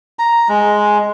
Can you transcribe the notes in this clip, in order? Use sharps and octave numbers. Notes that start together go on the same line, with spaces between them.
A#5
G#3